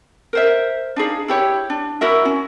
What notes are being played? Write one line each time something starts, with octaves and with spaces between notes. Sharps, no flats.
A#4 C5 E5
D4 D#4 G#4 F5
E4 G4 C#5
D4
E4 F#4 A#4 E5
C#4